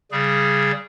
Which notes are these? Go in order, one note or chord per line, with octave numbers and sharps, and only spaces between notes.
C#3 G3 G#4